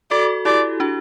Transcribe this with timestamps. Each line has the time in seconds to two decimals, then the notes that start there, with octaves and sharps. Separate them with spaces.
0.11 F#4 A4 D5
0.45 E4 G4 D5
0.80 D4 F#4